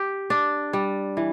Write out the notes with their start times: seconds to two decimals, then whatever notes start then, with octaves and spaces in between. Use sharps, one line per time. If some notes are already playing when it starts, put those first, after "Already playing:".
Already playing: G4
0.30 D4
0.73 G3
1.17 E3